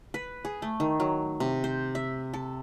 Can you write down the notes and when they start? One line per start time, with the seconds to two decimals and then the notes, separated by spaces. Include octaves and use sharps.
0.14 B4
0.45 G#4
0.62 A3
0.80 D#3
1.00 F#3
1.40 C3
1.64 C5
1.95 E5
2.34 A4